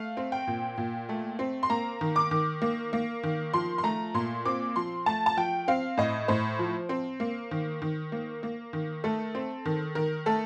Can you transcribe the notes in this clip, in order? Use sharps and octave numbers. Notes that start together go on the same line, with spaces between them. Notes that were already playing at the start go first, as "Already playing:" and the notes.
Already playing: A3 F5
C4
G5
A#2
A#2
A3
C4
C6
A#3 A#5
D#3
D6
D#3
A#3
A#3
D#3
F3 C6
C6
A3 A#5
A#2 C6
C4 D6
F3 C6
A3 A5
A5
F3 G5
C4 F5
A2 D#5
A2 C5
F3
C4
A#3
D#3
D#3
A#3
A#3
D#3
A3 A4
C4
D#3
D#3 A#4
A3 A4